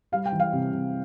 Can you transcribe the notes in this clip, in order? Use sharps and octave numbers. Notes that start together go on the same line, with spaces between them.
G3 F5
G5
E3
F5
C3
C3